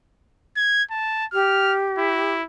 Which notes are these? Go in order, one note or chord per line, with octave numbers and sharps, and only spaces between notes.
G#6
A5
G4 F6
E4